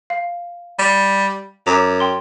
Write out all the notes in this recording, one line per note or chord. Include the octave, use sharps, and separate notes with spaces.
F5
G3
F#2 A#5 D6
G5 C6